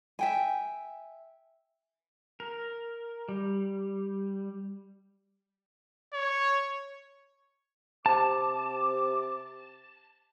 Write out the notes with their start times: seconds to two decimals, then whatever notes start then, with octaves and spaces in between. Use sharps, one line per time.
0.19 E5 G5 G#5
2.40 A#4
3.29 G3
6.13 C#5
8.06 C3 A5 D6